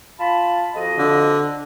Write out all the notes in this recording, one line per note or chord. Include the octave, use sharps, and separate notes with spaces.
F4 A5 B5
F2 F#4 D#5
D3